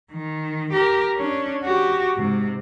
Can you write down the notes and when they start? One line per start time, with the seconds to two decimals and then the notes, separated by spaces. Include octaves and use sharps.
0.12 D#3
0.73 G4 A#4
1.16 C#4 D4
1.63 F#4 G4
2.17 G#2 C3